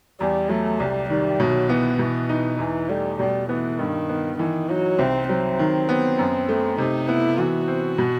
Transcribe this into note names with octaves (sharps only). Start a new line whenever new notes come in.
E2 G3
F#3 A3
C2 G3
D#3 G3
B2 F#3
E3 B3
B2 E3
D#4
E2 E3
G3 A3
B2 G3
E3 B3
G2 D#3
B3
D#3 E3
F#3 D#4
C2 C4
F#3 C4
D#3
B3
F#2
A3
C3 D#4
B3 E4
E3 F#4
C4
B2